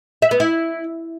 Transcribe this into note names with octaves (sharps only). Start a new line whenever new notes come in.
E5
B3
E4